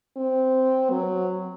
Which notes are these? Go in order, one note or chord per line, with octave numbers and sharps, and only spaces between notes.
C4
F#3